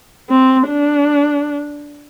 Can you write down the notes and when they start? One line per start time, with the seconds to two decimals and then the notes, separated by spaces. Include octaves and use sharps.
0.29 C4
0.68 D4